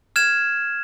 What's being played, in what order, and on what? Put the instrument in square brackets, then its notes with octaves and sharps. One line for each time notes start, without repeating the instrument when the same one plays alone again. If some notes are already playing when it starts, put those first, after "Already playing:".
[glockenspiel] F6 G#6 E7